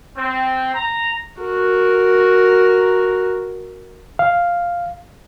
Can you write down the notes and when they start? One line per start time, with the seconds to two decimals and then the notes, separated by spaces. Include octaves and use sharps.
0.16 C4
0.74 A#5
1.41 F#4 A#4
4.19 F5